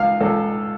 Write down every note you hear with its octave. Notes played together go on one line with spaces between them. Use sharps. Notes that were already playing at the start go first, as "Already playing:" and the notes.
Already playing: C#2 F5
C#2 A4